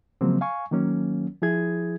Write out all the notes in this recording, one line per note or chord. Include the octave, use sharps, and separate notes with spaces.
C#3 F3 F#3 G#3 A#3 C4
F5 G#5 C#6
D#3 F#3 A#3 C#4
F3 E4 G#4 G#6